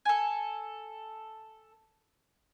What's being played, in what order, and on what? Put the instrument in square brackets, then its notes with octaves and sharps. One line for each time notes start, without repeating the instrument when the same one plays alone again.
[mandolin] A4 G#5